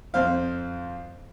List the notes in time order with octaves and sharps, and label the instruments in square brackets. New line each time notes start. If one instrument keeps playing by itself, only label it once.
[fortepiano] F2 C5 F5